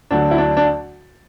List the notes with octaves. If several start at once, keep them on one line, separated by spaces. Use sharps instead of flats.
D2 D3 F#3 D4
E4
D4
D4